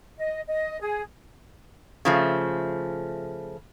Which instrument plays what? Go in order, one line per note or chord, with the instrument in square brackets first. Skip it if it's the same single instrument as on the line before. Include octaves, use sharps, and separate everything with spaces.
[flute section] D#5
D#5
G#4
[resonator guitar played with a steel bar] C#3 F3 A3